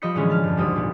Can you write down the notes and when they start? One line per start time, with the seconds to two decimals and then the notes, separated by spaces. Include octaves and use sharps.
0.02 F3 G3 D#5 B5 G6 C#7
0.15 A2 D3 E3 F#3 G#3 C#4
0.30 A5 F6
0.44 F1 G2
0.57 G#1 D2 G3 C4 D#6
0.76 A#2 B3